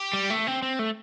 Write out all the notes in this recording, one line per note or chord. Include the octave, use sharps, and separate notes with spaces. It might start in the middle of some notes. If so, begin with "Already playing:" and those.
Already playing: G4
G3
A3
C4
C4
A3